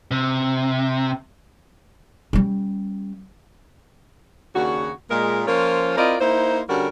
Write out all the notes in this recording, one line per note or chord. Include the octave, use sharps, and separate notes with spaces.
C3
G3 C#4
D#2 C#3 D4 F#4
A#2 G#3 A#4
F3 A#3 C#4 F4 C5 C#5
C4 E4 F4 A#4 D5 D#5
A#3 D#4 E4 C5
D3 G3 C#4 F#4 A#4